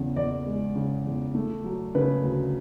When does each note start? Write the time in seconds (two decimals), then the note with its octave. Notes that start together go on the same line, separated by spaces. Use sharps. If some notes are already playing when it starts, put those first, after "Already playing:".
Already playing: E2 C#3
0.16 E2 D5
0.46 G#3
0.75 C#3
1.06 E2
1.35 A3
1.64 F#3
1.95 C#3 B4
2.24 D2